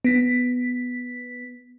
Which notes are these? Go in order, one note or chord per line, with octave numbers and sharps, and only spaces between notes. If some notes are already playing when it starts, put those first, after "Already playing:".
B3 B6